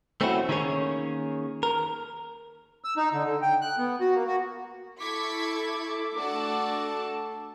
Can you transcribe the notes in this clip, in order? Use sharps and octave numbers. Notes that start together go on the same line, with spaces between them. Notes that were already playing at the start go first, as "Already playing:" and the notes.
A3 C4 C#4 D#4 E4 F#4
D#3 A#3 C#4 G#4 C#5
A#4
E6
D#4
D3
D3
G5
F#6
B3
F#4
A#3
F#4
E4 A4 C#6 D6 G#6 B6
A3 D4 F#4 A4 A5